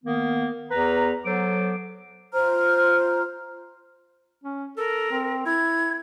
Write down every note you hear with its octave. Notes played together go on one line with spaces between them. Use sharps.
D#3 A#3 B3
E2 B4 A#5
F#3 B3 A4 C5 D6
F4 C5 A#5 F6
C#4
A4 A#4
C4
E4 G#6